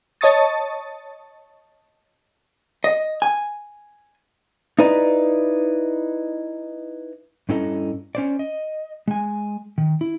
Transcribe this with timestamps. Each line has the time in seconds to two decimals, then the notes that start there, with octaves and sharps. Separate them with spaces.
0.21 C#5 D#5 A5 C#6 D#6 A6
2.84 D#5
3.22 G#5
4.79 D#4 E4 B4 D5 A#5
7.49 G2 C#4 E4 A4 D#5 A#5
8.15 C#4 C5 D5
8.39 D#5
9.08 G#3 G#5
9.78 D#3
10.01 E4